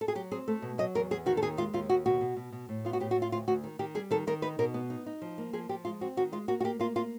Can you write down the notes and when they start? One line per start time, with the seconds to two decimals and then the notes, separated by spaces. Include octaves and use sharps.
0.01 A4
0.08 G#4
0.15 F#3 G4
0.31 C4 G#4
0.48 A3 A4
0.62 B2
0.78 F#3 D#5
0.95 E2 A#4
1.11 E2 G#4
1.26 D#3 F#4
1.37 A4
1.42 D#2 G#4
1.57 G#3 F4
1.73 D#2 F4
1.89 D#2 F#4
2.06 B2 F#4
2.21 B2
2.37 B2
2.52 B2
2.69 A2
2.85 B3 F4
2.93 F#4
3.00 A2 G4
3.11 F#4
3.16 A2
3.22 F4
3.32 D2 F4
3.48 D2 F#4
3.64 D#3
3.79 D#3 G4
3.95 G3 G#4
4.11 D#3 A4
4.27 D#3 A#4
4.42 D#4 B4
4.59 B2 A#4
4.74 B3
4.90 D#4
5.06 D#4
5.22 F3
5.38 A#3
5.53 F3 G#4
5.69 F3 G4
5.85 G#3 F4
6.01 C4 F#4
6.17 D#3 F#4
6.32 G#3 F4
6.48 A#3 F#4
6.60 F#4
6.64 A#3 G4
6.79 A#3 F4
6.96 A#3 F4